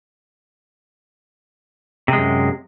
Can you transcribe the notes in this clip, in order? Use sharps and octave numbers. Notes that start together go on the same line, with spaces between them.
F#2 C3 G#3